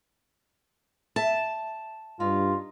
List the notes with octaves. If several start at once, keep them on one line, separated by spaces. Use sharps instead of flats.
E5 A5
G2 D#4 F4